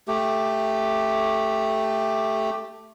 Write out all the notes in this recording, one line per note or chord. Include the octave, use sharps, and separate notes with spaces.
A3 G4